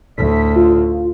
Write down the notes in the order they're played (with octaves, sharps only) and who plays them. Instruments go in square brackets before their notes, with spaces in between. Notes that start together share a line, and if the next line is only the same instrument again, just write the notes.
[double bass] D2 A2 [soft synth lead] B6
[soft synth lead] F4